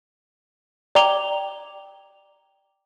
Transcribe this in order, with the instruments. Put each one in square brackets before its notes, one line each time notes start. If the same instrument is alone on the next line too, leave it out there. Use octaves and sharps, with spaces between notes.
[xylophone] D5 G5 A#5 D6 F7 G7